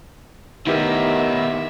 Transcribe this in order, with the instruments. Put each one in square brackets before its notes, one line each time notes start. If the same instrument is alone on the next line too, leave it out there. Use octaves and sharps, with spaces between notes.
[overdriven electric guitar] D#3 B3 [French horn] D#4 [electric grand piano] E4 G4 A#4 [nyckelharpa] E5